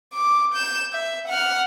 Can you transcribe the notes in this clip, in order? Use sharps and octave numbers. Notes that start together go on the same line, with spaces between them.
D6
G6 E7
E5
F#5 F6